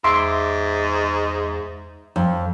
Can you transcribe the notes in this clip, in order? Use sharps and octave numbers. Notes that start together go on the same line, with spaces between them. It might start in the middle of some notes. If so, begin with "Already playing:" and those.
E2 G#2 E5 C6 D6
F2